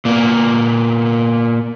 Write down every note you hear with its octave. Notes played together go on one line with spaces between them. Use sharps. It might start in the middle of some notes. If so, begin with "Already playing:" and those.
A#2 A#3 B3